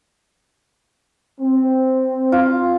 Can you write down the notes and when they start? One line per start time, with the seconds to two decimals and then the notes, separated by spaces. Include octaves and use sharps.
1.41 C4
2.32 F4